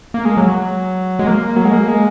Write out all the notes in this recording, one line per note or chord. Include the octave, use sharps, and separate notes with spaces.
A#3
G#3
F#3
G#3
A#3
F#3
G#3
A#3
G#3